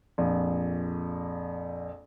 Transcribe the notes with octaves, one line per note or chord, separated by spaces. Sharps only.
A#1 F2